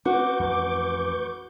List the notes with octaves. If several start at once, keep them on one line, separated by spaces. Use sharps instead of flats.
C4 C#4 F#4 B4 C#6 D6 G6
A1 F2